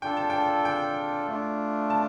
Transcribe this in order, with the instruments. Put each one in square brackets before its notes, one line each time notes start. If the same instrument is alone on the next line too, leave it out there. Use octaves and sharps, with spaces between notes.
[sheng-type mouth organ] D4 F4 A4 [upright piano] G5
[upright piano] A5
G5
G5
[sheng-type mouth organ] A3 D4 F4
[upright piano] A5